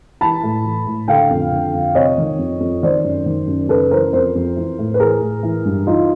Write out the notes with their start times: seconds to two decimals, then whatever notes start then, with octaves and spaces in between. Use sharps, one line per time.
0.21 E3 A5 B5
0.43 A2
0.65 E3
0.87 A2
1.08 D3 F5 G5
1.30 F2
1.52 D3
1.74 F2
1.95 C3 C#5 D#5
2.18 D#3
2.39 F2
2.60 F2
2.83 D#3 C5 D5
3.04 F#2
3.26 D#3
3.47 F#2
3.69 C#3 A4 B4
3.91 E3 A#4 C5
4.13 F2 A#4 C5
4.35 F2
4.56 E3
4.79 A2
4.94 B4
5.00 E3 G#4 A#4
5.21 A2
5.43 E3
5.65 G2
5.87 E3 D#4 F4